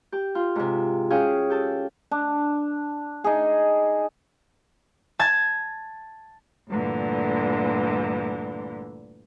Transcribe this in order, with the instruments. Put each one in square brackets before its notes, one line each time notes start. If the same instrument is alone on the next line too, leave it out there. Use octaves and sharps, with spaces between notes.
[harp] G4
F4
G#2 C3
C#4 F#4 G#4 F5 G5
G4 A4
[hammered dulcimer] D4
D#4 G#4
[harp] A5 G#6 A6
[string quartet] D2 G2 A#2 D3 E3